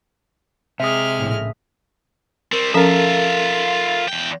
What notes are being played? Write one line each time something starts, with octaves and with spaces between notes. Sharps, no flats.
C3 G#3 E5 D#6 F6
A#1 A2 C#3
G3 C4 A#4
F3 C#4 F4 A4 A#4 E5 F5
E2 G5